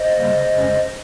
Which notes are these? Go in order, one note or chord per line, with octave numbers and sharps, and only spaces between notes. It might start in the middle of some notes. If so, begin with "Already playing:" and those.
Already playing: C5 D#5
C#3 G3 A#3
F2 C#3 G#3 C#4